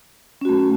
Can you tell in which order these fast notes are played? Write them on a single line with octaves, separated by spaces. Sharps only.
C#4 F#4 A3